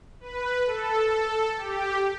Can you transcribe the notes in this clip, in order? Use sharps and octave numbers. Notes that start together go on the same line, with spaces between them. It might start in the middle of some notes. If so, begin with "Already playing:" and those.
B4
A4
G4